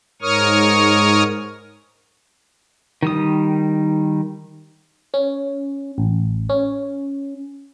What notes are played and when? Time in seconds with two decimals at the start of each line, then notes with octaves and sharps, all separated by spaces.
0.22 G#2 A#4 C#5 C#6 D#6 F6
3.03 D#3 G3 D#6
5.14 C#4
5.98 A1
6.49 C#4